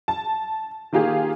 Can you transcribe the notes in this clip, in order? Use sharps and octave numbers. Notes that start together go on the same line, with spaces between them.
A5
D#3 A#3 F4 G4 G#4